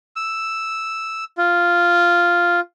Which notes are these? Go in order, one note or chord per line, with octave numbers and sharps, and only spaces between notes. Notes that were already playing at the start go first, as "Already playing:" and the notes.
E6
F4